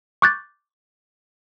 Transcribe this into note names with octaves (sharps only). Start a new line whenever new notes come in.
C#6 D6 F#6 G6 A6